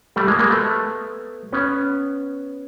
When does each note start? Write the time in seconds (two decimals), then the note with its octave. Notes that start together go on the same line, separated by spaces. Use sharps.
0.16 G3 A3
0.27 G#3 A#3
0.39 G#3 A#3
0.50 A3 B3
1.53 B3 C#4